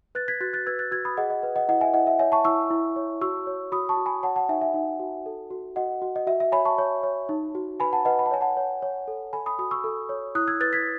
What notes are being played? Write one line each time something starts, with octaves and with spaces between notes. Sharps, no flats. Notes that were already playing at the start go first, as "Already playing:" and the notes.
B4 F#6 A6
G#6 B6
F#4 F#6 A6
F#6 A6
B4 E6 G#6
F#6 A6
F#4 E6 G#6
B5 D#6
G#4 D#5 F#5
D#5
B4
D#5 F#5
E4 D#5 F#5
E5 G#5
E4 D#5 F#5
E5
C#5 E5 G#5
A5 C#6
E4 C#6 E6
E4
C#5
F#4 C#6 E6
C#5
F#4 B5 D#6
A5 C#6
F#4
G#5 B5
C#5 F#5 A5
F#5 A5
D#4 E5 G#5
E5 G#5
D#4
F#4
A4
F#4
F#4 D#5 F#5
F#4
D#5
F#4 E5
E5
C#5 G#5 B5
A5 C#6
C#5
C#5
D#4
F#4
B4 G#5 B5
F#5 A5
B4 D#5 F#5
B5
A5
C#5 G#5
F#5 A5
C#5
C#5
A4
A4 G#5 B5
B5 D#6
F#4 B5 D#6
C#6 E6
A4
C#5
E4 D#6 F#6
E6 G#6
B4 F#6 A6
G#6 B6